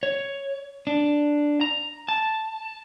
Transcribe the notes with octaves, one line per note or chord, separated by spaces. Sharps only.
C#5
D4
A#5
A5